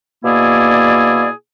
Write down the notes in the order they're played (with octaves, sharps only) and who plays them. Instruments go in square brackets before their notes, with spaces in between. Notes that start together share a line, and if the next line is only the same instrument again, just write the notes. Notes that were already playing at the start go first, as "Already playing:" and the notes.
[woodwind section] B2 A#3 E4 G#4 D5